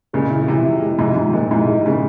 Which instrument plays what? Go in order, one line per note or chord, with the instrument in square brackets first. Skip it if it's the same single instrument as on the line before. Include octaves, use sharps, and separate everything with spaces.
[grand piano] A#2 C#3 [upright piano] G#3
[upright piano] E4
[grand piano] C3 E3 [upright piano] F3
[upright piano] E4
G#3
[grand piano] G#2 C3 [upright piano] F3
[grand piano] G#2 [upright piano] F3
[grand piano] A#2 [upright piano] G#3
[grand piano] G#2 C3 [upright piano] E4
[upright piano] G#3
[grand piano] A#2 C#3 [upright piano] G#3